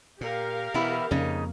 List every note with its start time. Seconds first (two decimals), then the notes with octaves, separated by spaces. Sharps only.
0.21 A#2 G4 A#4 F5
0.74 B2 E3 B3 E4
1.11 F2 C#3 A#3 D#4